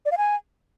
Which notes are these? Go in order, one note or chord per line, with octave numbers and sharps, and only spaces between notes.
D5
F5
G#5